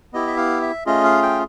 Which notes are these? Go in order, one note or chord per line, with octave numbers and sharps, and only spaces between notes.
B3 E4 G4 D#5
E5
F5
E5
A3 C#4 F4 G#4 D#5
F5
G5